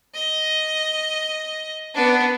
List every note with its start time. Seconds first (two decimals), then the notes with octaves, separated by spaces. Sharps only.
0.14 D#5
1.94 B3 D4